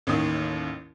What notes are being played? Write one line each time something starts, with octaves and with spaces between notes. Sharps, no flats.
A1 D#2 D#3 D#6